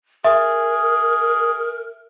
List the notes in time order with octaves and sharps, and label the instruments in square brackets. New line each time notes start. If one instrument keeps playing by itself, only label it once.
[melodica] G#4 [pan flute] A#4 [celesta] E5